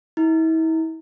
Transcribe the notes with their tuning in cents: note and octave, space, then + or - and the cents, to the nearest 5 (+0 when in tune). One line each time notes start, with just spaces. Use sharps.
E4 -40